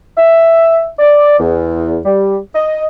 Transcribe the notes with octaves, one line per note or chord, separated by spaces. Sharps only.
E5
D5
E2
G3
D#5